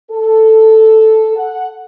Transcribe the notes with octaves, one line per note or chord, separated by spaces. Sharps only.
A4
F#5